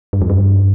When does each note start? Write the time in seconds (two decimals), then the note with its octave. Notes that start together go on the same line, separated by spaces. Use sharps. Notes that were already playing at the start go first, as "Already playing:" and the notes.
0.13 G2
0.21 F2
0.30 G2